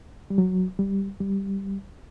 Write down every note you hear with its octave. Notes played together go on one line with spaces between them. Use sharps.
G3
F#3
G3
G3